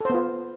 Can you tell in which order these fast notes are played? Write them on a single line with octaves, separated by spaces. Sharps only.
A4 C5 B3 F4